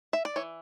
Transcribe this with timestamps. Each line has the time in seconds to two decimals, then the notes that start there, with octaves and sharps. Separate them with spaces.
0.13 E5
0.25 D5
0.36 E3 C#5